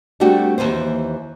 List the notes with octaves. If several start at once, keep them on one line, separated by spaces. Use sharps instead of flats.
G3 A3 C4 D4 F#4 G4
D#2 C#3 E3 C5